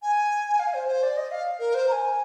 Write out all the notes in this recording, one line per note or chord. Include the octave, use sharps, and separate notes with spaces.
G#5
F5
C5
C5
D5
D#5
F5
A#4
C5
A#5
G#5